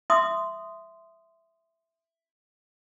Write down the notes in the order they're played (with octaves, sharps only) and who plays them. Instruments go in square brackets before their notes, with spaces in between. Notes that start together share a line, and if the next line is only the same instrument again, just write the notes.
[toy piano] E5 C6 D#6